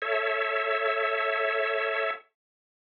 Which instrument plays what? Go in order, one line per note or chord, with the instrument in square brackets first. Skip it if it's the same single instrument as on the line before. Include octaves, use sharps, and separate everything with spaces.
[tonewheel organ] A4 C#5 E5